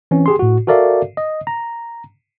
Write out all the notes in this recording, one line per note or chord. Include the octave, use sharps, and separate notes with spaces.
E3 C4 C#4
G4 G#4 C6
A2 F#4
F#4 A4 A#4 D5 E5 F5
D#5
A#5